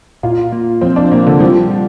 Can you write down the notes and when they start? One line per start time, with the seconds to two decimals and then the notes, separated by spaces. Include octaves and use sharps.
0.23 A#2 F4
0.52 A#3
0.81 F3 C4
0.96 D4
1.11 A#2 A#3
1.27 D3
1.40 F3 G3
1.70 G3